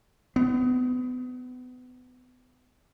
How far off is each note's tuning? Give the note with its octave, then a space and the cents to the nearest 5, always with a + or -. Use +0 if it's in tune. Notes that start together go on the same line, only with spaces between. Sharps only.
B3 +30